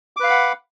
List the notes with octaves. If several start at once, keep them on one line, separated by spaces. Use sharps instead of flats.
B4 F5 F#5 B5 D6